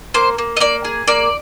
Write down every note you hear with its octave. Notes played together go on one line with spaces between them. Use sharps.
A#3 C5
A#3
D#5
A#3 D5
G#4
A#3 D5